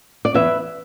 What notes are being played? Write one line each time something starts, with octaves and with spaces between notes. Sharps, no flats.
D5
E2 B4 E5